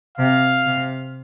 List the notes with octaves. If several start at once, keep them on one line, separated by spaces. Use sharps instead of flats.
C3 F5
C3